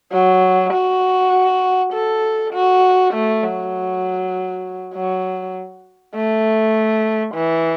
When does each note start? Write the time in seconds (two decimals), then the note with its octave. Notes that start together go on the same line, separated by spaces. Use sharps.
0.12 F#3
0.73 F#4
1.93 A4
2.53 F#4
3.13 A3
3.44 F#3
4.94 F#3
6.14 A3
7.34 E3